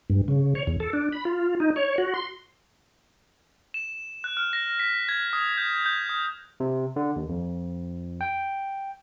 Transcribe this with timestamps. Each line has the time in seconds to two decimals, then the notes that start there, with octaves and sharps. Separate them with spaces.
0.10 G2
0.28 C#3
0.55 C#5
0.67 E2
0.80 A4
0.93 D4
1.12 B5
1.25 F4
1.60 D#4
1.76 C#5
1.98 F#4
2.14 C6
3.74 E7
4.24 F#6
4.37 F6
4.53 A#6
4.79 B6
5.09 G#6
5.33 D#6
5.57 G6
5.86 G6
6.09 D#6
6.60 C3
6.96 D3
7.16 D#2
7.29 F2
8.21 G5